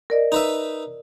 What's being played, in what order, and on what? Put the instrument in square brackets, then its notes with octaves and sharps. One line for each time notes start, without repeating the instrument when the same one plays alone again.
[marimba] A#4 D5 D#5
[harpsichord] D#4 B4 E5